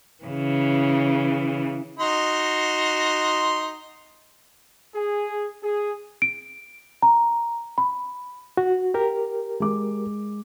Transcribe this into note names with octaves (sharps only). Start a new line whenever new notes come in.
C#3 E3
D#4 F#4 C6
G#4
G#4
D7
A#5
B5
F#4
G4 A#4
G#3 D6